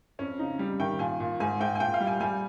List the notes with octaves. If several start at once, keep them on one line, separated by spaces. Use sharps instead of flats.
F2 C#4
C#3 D#4
G3
D#3 G5
A#2 G#5
A#2
G#2 G#5
G#2 G5
G#5
A#2 G5
F5
G3
G#5
G3 G#5